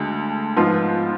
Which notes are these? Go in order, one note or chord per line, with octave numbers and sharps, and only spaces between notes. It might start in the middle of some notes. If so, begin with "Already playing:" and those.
Already playing: D2 D3 G#3
G#2 F3 B3 F4